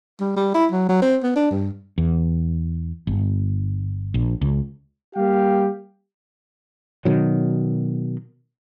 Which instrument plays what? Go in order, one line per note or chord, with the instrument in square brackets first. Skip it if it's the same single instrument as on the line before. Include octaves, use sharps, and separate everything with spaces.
[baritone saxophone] G3
G3
E4
F#3
F#3
C4
B3
D4
G2
[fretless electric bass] E2
G1
A#1
C#2
[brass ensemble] G3 A#3 G4 F5 G5
[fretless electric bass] B2 D#3 F#3